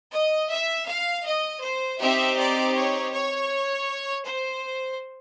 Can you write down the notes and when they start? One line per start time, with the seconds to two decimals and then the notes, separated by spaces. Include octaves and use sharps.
0.13 D#5
0.50 E5
0.88 F5
1.26 D#5
1.63 C5
2.00 C4 D#4 G4 E5
2.38 D5
2.76 C#5
3.14 C#5
4.26 C5